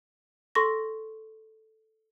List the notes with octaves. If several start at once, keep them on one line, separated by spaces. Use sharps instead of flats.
A4 C6 C#6 A#6